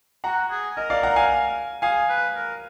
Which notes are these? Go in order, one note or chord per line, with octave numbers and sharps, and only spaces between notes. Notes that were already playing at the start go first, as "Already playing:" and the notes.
F#4 F#5 A#5
G#4
A#4 D#5
D5 F5
F#5 A#5
F5 G#5
G#4 F5 G#5
B4
A#4